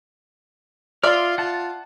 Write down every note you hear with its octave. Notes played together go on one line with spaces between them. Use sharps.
F4 D5 E5 C6 F6
F4 F#5 A5